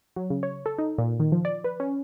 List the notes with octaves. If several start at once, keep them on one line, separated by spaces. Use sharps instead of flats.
F#3
C#3
C#5
A4
D#4
A#2
D#3
F3
D5
B4
C#4